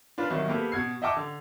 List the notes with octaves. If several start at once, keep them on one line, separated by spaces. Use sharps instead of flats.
D4 F4 B4 D5
C2 D#3 F#3
A#3 B3 G4 A4 B4
B2 F#5 G#6 C7
D#5 E5 F#5 G5 A5 D6
D3